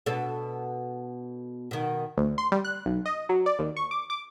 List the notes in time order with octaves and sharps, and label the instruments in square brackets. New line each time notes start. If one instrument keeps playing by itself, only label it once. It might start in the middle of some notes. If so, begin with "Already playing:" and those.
[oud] B2 D4 A4
B2 D#3
[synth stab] D2
C6
G3
F#6
B1
D#5
F#3
D5
D#2
C#6
D6
D6